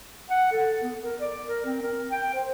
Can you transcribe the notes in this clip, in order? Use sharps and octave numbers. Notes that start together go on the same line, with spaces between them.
F#5
A4
B3
A#4
D5
A#4
C4
A#4
G5
C5